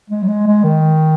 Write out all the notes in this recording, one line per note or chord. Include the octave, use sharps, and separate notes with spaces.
G#3
F#3
G#3
G#3
D#3